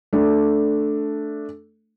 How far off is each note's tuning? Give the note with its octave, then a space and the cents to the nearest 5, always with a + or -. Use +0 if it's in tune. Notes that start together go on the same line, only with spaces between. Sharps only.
A3 +0 D4 +0